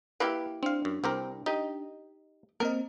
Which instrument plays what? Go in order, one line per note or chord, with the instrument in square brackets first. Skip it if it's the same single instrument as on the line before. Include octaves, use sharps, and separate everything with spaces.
[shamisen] A#3 E4 G4 [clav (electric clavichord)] B4
[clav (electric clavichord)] C4 F5 [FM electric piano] D4
[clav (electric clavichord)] F#2
[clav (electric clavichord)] C2 G4 A#4 [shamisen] C4
[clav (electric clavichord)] D#4 [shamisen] G4 D#5
[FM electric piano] A#3 C4 D#5 [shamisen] A#4